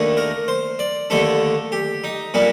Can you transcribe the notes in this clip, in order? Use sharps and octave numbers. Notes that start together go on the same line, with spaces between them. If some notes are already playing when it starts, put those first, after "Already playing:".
Already playing: D#2 D#3 A3 D4
A#4
C5
D5
D#2 D3 A3 D4 A4
G4
D#4
A#2 G3 A#3 D4